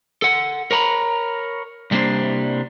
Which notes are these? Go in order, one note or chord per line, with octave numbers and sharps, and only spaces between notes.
A4 F#5
A#4 C#5 A#5 B5
C2 G3 A#3 D4 C5